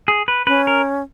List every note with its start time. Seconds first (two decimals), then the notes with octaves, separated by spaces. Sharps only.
0.08 G#4
0.28 B4
0.47 C#4 B4
0.67 A#4